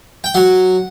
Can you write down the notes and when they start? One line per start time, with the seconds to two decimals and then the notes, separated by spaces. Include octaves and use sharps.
0.24 G5
0.34 F#3 F#5